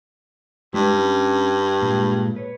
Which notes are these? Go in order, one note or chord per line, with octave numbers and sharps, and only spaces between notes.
G2 G#3 E4 B4
C#4
A#2 G#3
B4 C#5